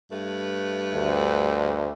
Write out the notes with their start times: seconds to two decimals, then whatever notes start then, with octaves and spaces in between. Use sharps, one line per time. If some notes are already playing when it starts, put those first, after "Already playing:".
0.10 G2 A3 B4
0.95 D2